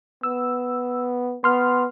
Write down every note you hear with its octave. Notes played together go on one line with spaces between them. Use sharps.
B3 E6
B3 C6 F6